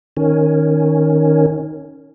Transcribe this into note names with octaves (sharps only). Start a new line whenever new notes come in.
D#3 C#4